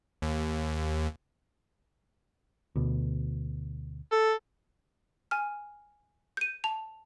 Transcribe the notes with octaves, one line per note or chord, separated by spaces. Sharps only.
D#2
D2 B2
A4
G#5 F6
G6 D#7
A5 F7